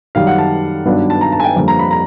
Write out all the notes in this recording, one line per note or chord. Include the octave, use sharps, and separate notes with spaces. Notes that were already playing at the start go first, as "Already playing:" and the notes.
F#2 D#3 G3 F5
F#5
A5
G2 D#3 F#3 B3 D4
A5
A#5
A5
G#5
G5
F2 D3 G3 A#3
A#5
B5
A#5